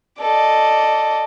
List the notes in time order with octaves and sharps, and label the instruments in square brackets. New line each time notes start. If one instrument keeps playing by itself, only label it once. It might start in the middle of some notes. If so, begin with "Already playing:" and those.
[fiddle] A4 [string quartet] D5 D#5